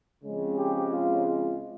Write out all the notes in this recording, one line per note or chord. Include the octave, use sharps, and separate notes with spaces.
C#3 F3 G#3 C4
G4
F4
F4